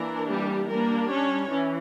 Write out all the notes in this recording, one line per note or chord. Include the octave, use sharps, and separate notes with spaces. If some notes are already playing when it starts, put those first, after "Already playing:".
Already playing: E3 A#3 D4 A#4
G3 G4
G3 A#3 D4 A#4
C#4 C#5
E3 C#4